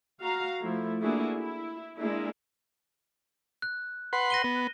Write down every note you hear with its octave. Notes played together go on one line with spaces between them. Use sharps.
F#4 F5 A#5
F3 A3 E4
A#3 D4 E4 F#4 G#4 A4
E4
G#3 A#3 D4 E4
F#6
B4 F#5 C6
A#6 D#7 G7
B3